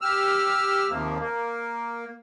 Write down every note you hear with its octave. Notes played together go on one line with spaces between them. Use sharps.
G4 E6 F6
D#2 C3 F3 A#3
A#3